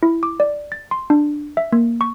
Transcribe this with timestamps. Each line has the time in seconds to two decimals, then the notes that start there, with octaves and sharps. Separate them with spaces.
0.03 E4
0.23 D6
0.40 D5
0.72 A6
0.91 C6
1.10 D4
1.57 E5
1.72 A#3
2.01 C#6